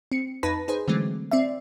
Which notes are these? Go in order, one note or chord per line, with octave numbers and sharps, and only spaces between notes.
C4 C#7
F2 D#4 B4 A5 B5 A#6
D#4 G#4 B4 C5
D3 E3 F#3 G#3 A3 C4
C4 D5 E5